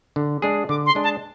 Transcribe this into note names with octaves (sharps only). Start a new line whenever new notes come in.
D3
G#3 D4 G#4
D3 D6
C6
G#3 D4 G#4
A5